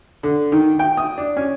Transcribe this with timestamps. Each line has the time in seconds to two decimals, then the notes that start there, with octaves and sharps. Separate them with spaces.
0.23 D3
0.52 D#3
0.79 G5
0.97 D#6
1.18 D4
1.37 C#4